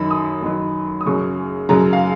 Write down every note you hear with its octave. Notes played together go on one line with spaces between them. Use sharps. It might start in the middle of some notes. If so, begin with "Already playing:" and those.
Already playing: F#2 D#3 F#3 B5
D#6
F#2 D#3 F#3
D#6
F#2 C#3 F#3 C#6
F#2 C#3 F#3 A#5
F5